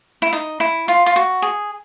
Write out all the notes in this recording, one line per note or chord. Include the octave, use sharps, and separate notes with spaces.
E4
D#4
E4
F4
F4
F#4
G#4